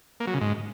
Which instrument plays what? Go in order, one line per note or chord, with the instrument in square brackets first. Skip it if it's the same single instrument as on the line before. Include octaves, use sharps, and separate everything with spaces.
[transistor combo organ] A#3
F#3
C#3
G#2